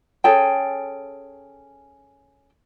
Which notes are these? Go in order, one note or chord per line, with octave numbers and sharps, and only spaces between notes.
C#4 G#4 A4 G5